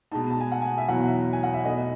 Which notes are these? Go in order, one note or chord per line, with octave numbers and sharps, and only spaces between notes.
B2 G#3 D#4 A5
A5
G#5
F#5
G#5
E5
E2 B2 F#3 B3 F#5
E5
G#5
F#5
E5
B2 A3 D#4 D#5